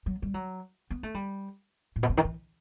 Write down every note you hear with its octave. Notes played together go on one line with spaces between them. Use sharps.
F#3
G3
F#3
B3
A3
G3
A2
B2
C3
D#3
E3